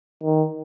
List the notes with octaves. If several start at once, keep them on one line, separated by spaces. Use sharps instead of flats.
D#3